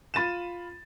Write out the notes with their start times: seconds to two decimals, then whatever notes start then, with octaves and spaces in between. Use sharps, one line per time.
0.14 F4 B5 A6 D#7 E7